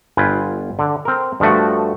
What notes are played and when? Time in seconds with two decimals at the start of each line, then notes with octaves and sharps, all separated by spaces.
0.17 G1 F4 B4 G5 G#5
0.79 D3
1.05 C4 A#4
1.40 G2 F3 A3 F#4